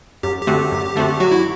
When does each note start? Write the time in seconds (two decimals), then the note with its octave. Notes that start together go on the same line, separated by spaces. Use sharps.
0.23 F#2 G4
0.41 G4
0.47 D3 A3 C4 F#4
0.72 F#2
0.96 D3 A3 C4 F#4
1.20 F#3 F#4
1.32 E4